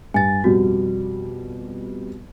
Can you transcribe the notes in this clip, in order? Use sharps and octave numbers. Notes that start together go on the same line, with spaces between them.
G2 G#5 A6
F2 B2 G3 F#4